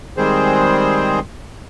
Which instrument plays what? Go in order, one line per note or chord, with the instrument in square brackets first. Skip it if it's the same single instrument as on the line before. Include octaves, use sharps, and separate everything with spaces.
[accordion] D#3 G3 G#3 C4 G#4 C5